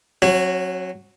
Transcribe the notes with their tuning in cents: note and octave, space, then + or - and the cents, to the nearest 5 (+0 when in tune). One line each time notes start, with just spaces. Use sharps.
F#3 +0 C#4 -45 F#4 +0